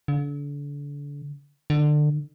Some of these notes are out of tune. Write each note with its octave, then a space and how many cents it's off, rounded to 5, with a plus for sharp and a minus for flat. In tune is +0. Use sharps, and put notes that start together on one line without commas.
D3 -35
D3 +25